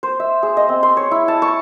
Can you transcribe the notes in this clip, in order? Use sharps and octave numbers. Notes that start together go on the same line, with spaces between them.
C5
E5
G#4
D#5
C4
C6
C#5
E4
A5
C#6